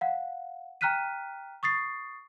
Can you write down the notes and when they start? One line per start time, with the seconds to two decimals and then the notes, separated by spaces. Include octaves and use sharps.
0.01 F5 F#5
0.81 G5 A#5 F6 F#6 B6 D#7
1.63 C#6 D#6 A6 C7